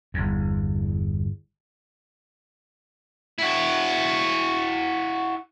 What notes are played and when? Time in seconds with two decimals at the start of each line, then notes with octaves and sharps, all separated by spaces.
0.14 G1 E2
3.39 E4 F#4